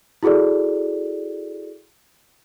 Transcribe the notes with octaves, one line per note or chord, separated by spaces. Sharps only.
E4 F#4 G#4 A4 D5